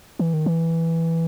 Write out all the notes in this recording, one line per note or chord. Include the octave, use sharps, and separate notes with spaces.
E3
D#3
E3